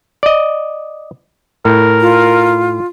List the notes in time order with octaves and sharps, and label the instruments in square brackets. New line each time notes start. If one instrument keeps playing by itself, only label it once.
[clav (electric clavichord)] D5 D#5
[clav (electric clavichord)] A2 [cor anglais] A#4
[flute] F4